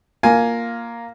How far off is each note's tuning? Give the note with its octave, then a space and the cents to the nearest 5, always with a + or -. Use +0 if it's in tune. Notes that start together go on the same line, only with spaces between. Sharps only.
A#3 +0 F4 +0 G#5 +10